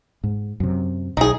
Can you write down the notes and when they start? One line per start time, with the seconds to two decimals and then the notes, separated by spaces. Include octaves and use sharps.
0.24 G#2
0.60 F#2 C3
1.17 B1 D#3 G#4